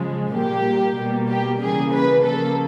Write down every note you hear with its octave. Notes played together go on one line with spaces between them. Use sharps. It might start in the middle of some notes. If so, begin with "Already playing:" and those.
Already playing: C#3 F3 G#3
A#2 G3 A#3 G4
B2 G3 A#3
G4
C#3 E3 G3 A#3 G#4
B4
C#3 F3 A#3 A4